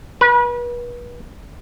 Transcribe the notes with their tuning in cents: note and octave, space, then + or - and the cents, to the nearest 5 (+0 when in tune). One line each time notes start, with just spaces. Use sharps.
B4 -35